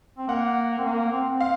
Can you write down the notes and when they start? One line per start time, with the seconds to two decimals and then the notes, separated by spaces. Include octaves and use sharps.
0.18 C4
0.28 A#3 F#5
0.78 C4
0.85 A#3
1.12 C4
1.31 C4
1.41 F5